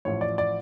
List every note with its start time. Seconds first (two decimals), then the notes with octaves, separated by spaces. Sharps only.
0.05 A1 A2 F3 C#5
0.21 D5
0.38 D5